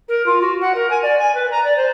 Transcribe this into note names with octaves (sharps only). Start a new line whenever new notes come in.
A#4
F4
F#4
F#5
A#4
G#5
D5
G#5
B4
A#5
D5
C5